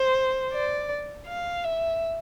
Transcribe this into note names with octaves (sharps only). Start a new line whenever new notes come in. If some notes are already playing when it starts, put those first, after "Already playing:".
Already playing: C5
D5
F5
E5